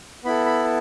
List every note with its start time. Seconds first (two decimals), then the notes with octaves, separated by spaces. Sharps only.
0.24 B3 E4 A4 B5
0.46 B5